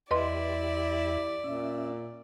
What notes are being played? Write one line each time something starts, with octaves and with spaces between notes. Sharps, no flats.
E2 E4 G4 B4 D5 D#5 C6
A#2 C#4 E5